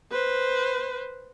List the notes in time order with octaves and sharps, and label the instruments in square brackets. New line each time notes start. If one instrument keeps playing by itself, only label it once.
[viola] B4 C5